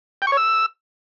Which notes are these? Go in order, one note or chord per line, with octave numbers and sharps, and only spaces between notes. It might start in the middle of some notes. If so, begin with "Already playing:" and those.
G5
C#6
C#5
E6